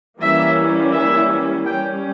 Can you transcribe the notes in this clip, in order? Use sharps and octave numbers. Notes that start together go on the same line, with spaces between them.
E3 G3 A#3 C#4 E5
E5
G3 C#4 G5